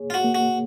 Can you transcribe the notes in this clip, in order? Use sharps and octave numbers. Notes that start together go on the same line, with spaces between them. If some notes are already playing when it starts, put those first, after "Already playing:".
Already playing: A#3 G#4 C#5
F4
F#4
A#3
F#4